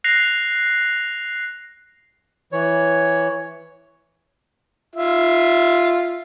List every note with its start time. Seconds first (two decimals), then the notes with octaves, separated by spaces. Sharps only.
0.04 F#6 A#6 C7 F7
2.52 E3 C#5
4.95 F4 E5